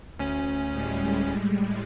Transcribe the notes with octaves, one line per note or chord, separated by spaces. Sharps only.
D2 C#4
A2 G3 G#3